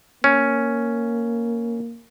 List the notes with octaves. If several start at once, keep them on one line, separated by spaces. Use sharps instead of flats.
A#3 C#4